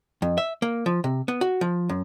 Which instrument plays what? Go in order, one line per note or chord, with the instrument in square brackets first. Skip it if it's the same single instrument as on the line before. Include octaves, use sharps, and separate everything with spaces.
[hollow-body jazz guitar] F2
E5
A#3
F3
C3
B3
F#4
F3
F#2